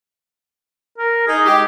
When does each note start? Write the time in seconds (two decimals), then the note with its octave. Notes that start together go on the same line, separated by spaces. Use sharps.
0.98 A#4
1.27 D#4 G#4
1.46 G#3 D#4 G4